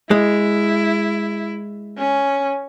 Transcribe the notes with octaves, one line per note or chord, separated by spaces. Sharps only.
G#3 E4
C#4